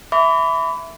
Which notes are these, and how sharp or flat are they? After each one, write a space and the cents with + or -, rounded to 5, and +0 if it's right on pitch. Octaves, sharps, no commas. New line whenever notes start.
E5 +0 B5 +20 D6 -35